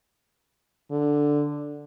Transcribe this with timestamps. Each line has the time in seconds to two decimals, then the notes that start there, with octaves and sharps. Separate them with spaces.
0.91 D3